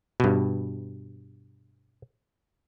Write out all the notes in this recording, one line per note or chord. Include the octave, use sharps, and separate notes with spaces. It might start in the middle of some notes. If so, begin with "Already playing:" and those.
G2 B2